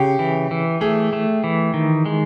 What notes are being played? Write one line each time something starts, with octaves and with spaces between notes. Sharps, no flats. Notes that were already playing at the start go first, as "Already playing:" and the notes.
Already playing: C#3 G4
E3
E3
A3 G#4
A3
E3
D#3
G#3